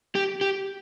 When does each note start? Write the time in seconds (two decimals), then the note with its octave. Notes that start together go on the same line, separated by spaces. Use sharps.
0.15 G4
0.41 G4